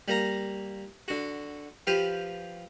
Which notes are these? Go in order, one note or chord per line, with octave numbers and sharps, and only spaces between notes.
G3 A#3 A#5
D3 F#4
F3 G4 B4 F5